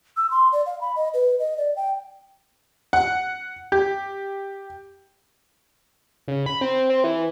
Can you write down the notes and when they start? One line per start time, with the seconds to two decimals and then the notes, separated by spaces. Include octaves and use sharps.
0.17 E6
0.31 C6
0.52 D5
0.66 F5
0.81 B5
0.96 D#5
1.14 B4
1.39 D#5
1.58 D5
1.76 G5
2.93 F#5
3.72 G4
6.28 C#3
6.46 B5
6.61 C4
6.90 C4
7.04 E3